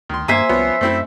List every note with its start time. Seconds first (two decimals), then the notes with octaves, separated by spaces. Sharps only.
0.09 D2 D#3 C6
0.28 G2 A#3 C5 E5 G#5
0.49 C2 F3 B3 C#4
0.81 F#2 A3 C4 E4